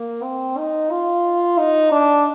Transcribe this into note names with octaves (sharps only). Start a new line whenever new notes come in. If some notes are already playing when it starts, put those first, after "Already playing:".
Already playing: A#3
C4
D#4
F4
D#4
D4